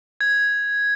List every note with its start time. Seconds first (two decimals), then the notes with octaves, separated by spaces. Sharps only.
0.21 G#6